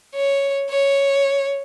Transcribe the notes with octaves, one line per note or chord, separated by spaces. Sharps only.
C#5
C#5